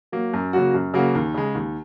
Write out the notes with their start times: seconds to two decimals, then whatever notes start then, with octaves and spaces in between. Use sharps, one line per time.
0.12 F#3 A#3
0.33 F#2
0.53 C#3 F#3 A#3 F#4
0.74 F#2
0.94 C#3 F#3 A#3 F#4
1.15 D#2
1.34 C#3 G#3
1.55 D#2